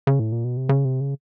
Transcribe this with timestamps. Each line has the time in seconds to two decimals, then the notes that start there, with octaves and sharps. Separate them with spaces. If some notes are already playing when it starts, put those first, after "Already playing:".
0.07 C#3
0.19 A2
0.32 A#2
0.44 B2
0.57 C3
0.69 C#3
0.85 C3
1.00 C#3